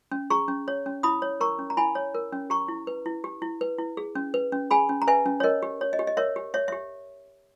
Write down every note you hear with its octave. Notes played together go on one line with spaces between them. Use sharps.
C#4
G#4 A#5 C#6
C#4
C#5
C#4
E4 B5 D#6
C#5
A#4 A#5 C#6
C#4
A#5
E4 G#5 B5
C#5
A#4
C#4
G4 A#5 C#6
E4
B4
E4
G4
E4
B4
E4
G#4
C#4
B4
C#4
G#4 G#5 B5
C#4
A#5
B4 E5 G#5
C#4
C#5
A#4 D#5
G4
C#5
D#5
G4
D#5
A#4 C#5 E5
G4
C#5 E5
E5
G4